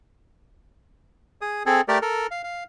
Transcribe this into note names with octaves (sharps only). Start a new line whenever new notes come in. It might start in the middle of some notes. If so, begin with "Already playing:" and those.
G#4 D#6
C4 G#4 A4
A3 G4 A#4 D5
A4 A#4
F5
F5